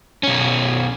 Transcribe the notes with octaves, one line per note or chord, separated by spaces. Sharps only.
B1 C#4